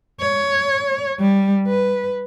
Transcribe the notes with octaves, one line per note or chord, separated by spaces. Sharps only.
C#5
G3
B4